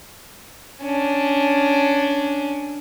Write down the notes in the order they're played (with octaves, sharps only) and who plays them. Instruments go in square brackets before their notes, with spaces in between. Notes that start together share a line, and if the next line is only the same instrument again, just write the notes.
[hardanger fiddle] C#4 D4